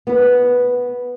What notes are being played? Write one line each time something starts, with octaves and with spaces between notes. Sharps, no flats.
B3 B4